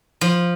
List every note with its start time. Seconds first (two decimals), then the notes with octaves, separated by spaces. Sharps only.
0.21 F3